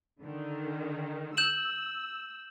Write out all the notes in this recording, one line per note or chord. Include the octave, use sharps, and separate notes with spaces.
D3 D#3
E6 G6 E7 F#7